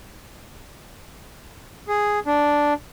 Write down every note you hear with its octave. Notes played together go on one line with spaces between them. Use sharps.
G#4
D4